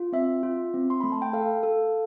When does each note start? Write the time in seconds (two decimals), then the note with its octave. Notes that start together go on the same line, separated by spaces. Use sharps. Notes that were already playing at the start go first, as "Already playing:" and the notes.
Already playing: F4
0.12 C4 E5
0.43 F4
0.74 C4
0.90 C6
1.00 A3 B5
1.12 A5
1.22 G5
1.33 A4 F5
1.63 A4